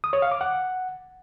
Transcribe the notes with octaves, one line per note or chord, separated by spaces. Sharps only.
D#6
C#5
F5
D6
F#5